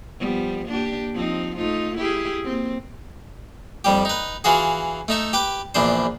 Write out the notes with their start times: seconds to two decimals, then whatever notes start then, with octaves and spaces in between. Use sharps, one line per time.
0.19 F3 G3 B3
0.66 A#3 D4 G4
1.13 F3 C4 D#4
1.56 A3 D#4 F4
1.96 E4 G4 G#4
2.44 A#3 C4
3.84 F2 G3 G4
4.05 D#4 B4
4.44 E3 F4 F#4 G#4
5.08 A3 D#4 E5
5.33 G4 B4 D6
5.75 A#1 E2 D4 C5